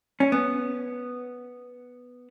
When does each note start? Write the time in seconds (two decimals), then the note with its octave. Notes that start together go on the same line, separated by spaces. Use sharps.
0.20 C#4
0.32 B3